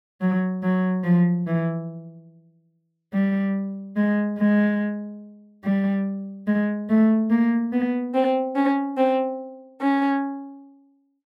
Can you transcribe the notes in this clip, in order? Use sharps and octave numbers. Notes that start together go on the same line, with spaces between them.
F#3
F#3
F3
E3
G3
G#3
G#3
G3
G#3
A3
A#3
B3
C4
C#4
C4
C#4